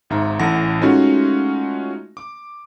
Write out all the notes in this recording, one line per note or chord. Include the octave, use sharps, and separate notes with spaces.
G#1 G#2 E5 A#5
A1 A2 E3 F#5 A5 A#6
G#3 A3 C#4 D#4 F4 F#4
D6